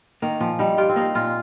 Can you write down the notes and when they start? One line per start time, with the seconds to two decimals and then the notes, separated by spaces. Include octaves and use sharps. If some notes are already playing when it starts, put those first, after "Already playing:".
0.22 D#3 A#3
0.40 A#2 F3
0.59 G3 D#4
0.78 F4 G4
0.89 C4
0.96 A#3 D#4
1.15 A#2 F4